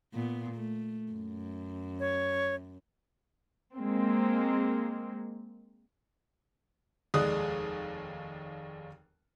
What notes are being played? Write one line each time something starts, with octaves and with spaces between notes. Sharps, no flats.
A#2 B3
A3
F#2
C#5
G#3 A#3 C4
F1 D#2 G#3 D5 D#6 F#6